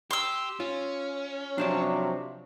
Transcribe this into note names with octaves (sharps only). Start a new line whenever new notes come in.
G4 C6 E6
C#4 F4
C3 F3 F#3 D4 C5 D5